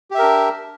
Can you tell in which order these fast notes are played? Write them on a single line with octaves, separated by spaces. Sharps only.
G4 E5 A#4 D4